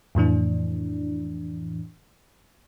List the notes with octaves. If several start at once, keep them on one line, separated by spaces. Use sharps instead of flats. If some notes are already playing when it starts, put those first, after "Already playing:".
F2 A2 E3 D4